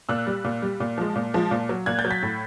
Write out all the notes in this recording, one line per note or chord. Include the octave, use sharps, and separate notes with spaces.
A#2 E6 F#6
G3
A#2
G3
A#2
F3 G#3
A#2
F3 G#3
A#2
F#3
A#2 F#6 G#6
G6 A6
F#3
A6 B6
A2